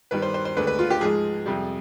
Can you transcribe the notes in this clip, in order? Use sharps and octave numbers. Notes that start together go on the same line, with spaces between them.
G2 D#3 G3 B4
C5
C5
C5
D2 D3 G#3 B4
B4
F4
G4
G#2 F3 G#3 G#4
F2 C3 G3